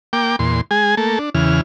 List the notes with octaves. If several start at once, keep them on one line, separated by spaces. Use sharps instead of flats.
A#3 G5 D6
E2 A#2 C6
G#3 G#4 G#5
A3 A#3 A4
D4
E2 C#3 E3 F6